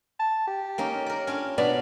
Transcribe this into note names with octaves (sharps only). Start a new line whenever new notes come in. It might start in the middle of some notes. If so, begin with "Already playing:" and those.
A5
G4
A#3 C#4 D#4
A#4 D5
C#4 D4 F4
B2 B3 D4 D5